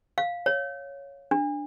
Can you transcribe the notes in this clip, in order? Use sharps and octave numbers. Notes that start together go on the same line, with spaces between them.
F5
C#5
D4